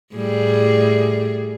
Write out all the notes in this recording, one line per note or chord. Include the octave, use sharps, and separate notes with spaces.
A2 G3 G#4